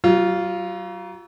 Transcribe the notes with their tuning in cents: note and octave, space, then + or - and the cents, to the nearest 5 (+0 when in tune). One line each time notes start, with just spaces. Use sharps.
F#3 +40 F4 +0